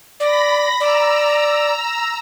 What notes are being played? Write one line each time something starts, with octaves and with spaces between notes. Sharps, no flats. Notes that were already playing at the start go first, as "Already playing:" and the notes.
D5 B5 A#6
D5 A#5 E6